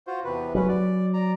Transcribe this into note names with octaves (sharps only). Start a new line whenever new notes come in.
F4 F#4 C5
E2 C3 B4
F#3 C#4 B4
D5
D5 A#5